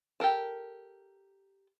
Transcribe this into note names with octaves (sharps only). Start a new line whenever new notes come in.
G4 A4 A#4 A5